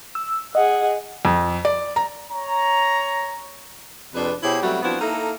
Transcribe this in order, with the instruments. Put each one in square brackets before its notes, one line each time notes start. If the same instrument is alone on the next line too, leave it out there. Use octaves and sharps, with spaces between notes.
[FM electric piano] E6
[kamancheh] G#4 F#5 [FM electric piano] D#5
[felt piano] F2
D5
A#5
[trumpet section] C#5 A#5
[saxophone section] F2 C3 D4 G#4 B4
B2 E4 G4 G#4 C5 C#5
F#3 G3 A3 B3 C4 F#4
F3 B3 C4 D4 E4 F#4
A#3 D#4 E4 A4